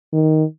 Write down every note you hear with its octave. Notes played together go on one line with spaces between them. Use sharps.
D#3